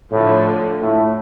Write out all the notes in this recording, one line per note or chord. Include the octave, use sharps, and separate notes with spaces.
A2 D3 F3 A3
A2